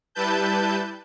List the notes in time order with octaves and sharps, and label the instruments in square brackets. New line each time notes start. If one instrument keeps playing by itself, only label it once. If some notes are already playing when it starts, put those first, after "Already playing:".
[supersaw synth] G3 E4 B4 A5 G6